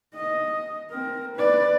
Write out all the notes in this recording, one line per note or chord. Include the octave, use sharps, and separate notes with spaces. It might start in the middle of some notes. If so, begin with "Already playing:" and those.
D#5
C4 A#4
B4 D5